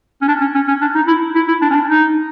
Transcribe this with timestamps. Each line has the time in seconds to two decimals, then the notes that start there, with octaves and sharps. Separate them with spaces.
0.22 C#4
0.28 D4
0.41 C#4
0.55 C#4
0.68 C#4
0.82 D4
0.95 D#4
1.08 E4
1.35 E4
1.48 E4
1.62 D4
1.71 C#4
1.75 D4
1.88 D#4